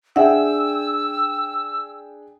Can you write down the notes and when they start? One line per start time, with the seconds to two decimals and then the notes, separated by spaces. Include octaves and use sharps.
0.16 D4 G#4 E5 F#5 G5 E6